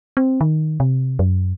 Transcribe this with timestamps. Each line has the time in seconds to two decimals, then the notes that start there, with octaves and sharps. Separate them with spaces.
0.17 C4
0.41 D#3
0.80 C3
1.19 F#2